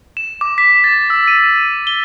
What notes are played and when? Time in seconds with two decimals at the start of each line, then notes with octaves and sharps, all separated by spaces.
0.17 E7
0.41 D6
0.58 B6
0.84 A6
1.10 E6
1.28 D#7
1.87 G7